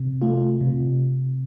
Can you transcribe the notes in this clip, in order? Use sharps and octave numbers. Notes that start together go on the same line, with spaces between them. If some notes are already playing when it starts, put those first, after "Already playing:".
Already playing: C3
A3 F4
C3